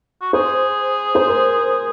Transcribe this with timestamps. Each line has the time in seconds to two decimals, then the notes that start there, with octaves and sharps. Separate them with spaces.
0.22 F#4
0.33 G#4 C5
1.15 C5
1.28 A#4